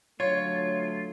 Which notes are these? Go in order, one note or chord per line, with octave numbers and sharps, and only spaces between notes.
D3 F#3 A3 F4 C#5